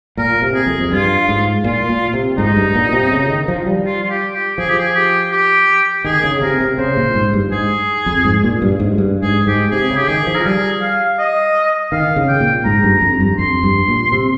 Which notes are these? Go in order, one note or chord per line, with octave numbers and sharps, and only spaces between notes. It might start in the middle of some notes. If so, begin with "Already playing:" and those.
A#2 A#4
C3
G#4
F2
F2
G2 F4
G#2
A#2 F4
A#2
C3
G#2 D#4
G2
A#2
C3
C#3
D#3
F3
G3
F4
F4
G4
G4
F3 G#4
G4
G#4
G4
G4
D#3 G#4
C#3
C3 A#4
C3
C#3 C5
A#2
G#2
G2
G#2 G#4
F2
G#2
A#2
G2
G#2
G2
G#2 G#4
G#2 G4
C3 G#4
C#3
G4
D#3 G#4
F3
A#4
G3 G#4
F5
D#5
D#3 F5
C#3
G5
A#2
G#2 A#5
G2
F2
G2
F2 C6
G2
A#2
C3